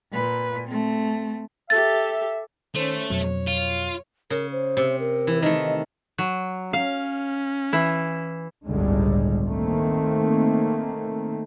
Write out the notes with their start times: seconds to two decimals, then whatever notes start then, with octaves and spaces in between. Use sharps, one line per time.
0.12 A#2 B4
0.68 A3 C4
1.70 G4 A4 E5 A6
2.75 D#3 A3 C#4 C5
3.10 F2 B2 F#3 C#5
3.47 F4
4.30 C#3 A#4
4.52 C5
4.77 C3
5.00 A#4
5.27 E3
5.42 D#3 A3 D#5
6.18 F#3
6.73 C#4 F5
7.73 E3 E4
8.66 G1 C#2 A2 D3 G3 G#3
9.47 D#3 A3 A#3 C4